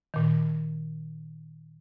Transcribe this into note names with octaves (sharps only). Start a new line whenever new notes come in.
A#2 D#3